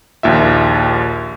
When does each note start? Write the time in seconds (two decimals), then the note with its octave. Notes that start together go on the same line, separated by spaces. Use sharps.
0.23 A#1 D#2 F4 E5